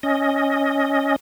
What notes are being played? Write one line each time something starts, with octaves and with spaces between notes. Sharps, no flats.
C#4 D#5